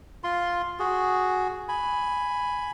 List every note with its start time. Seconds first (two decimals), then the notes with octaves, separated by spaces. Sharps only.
0.24 F4 C6
0.79 F#4 G#4
1.69 G#5 B5